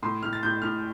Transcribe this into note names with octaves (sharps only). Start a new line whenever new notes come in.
A2 C6
A2 F6
A6
A2 G6
A2 F6